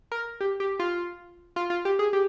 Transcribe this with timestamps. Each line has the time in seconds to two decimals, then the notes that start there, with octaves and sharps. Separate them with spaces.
0.12 A#4
0.41 G4
0.60 G4
0.80 F4
1.56 F4
1.70 F4
1.85 G4
1.99 G#4
2.13 G4